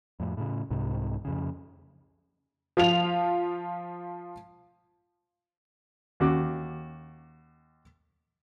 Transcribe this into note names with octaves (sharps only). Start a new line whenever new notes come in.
F2 A2
A2 C#3
C2 G#2 C3
F2 C#3
F3 F4 F7
D#2 F#4 D6